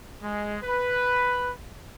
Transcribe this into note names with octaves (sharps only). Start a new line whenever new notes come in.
G#3
B4